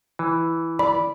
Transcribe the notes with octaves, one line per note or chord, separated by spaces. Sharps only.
E3
D5 B5